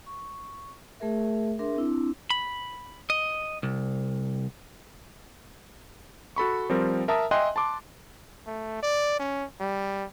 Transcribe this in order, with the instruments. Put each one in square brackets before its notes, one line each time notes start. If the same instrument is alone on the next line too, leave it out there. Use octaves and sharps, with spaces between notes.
[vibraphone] C#6
A3 G#4 A#4 E5
D4 G#4 A#4 E5 C6
C4 D4 E4
[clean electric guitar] B5
D#5
C2
[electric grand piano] F#4 A4 B5 C#6
F3 G3 C4 A#4
A#4 E5 A5 A#5 D#6
D#5 E5 G5 G#5 C6 F#6
A5 C6 D6
[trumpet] A3
D5
C#4
G3